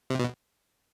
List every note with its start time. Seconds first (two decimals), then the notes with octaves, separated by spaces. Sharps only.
0.10 C3
0.19 B2